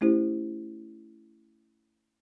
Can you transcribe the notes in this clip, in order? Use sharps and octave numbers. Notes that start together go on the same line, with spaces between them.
A3 C#4 E4 G4 C5